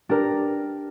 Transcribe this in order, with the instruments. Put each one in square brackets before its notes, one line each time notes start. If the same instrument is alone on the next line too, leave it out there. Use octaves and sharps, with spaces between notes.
[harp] D4 G4 A#4